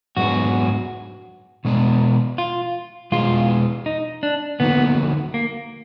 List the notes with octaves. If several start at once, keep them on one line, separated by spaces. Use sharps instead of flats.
G#2 F#3 B3 D4 F#4 G#4
B2 G#3 D4
F4
B2 G#3 D4 F4 G#4
D#4
D4
D3 F#3 A#3 B3 D#4 F#4
A#3